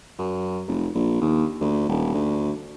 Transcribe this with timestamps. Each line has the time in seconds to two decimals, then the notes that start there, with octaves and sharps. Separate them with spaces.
0.19 F#2
0.68 F1
0.95 A#1
1.21 D#2
1.61 D2
1.89 D#1
2.14 D2